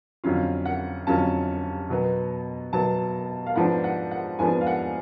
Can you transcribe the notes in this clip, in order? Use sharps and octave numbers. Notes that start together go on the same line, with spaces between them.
F2 D3 F#3 C#4 F4 F5
F#5
F2 D3 F#3 C#4 F4 A5
B2 F#3 B3
B2 F#3 B3 A5
F5
G#2 F3 B3 D4 F#5
F#5
F#5
G#2 F3 B3 D4 G#5
F5
F#5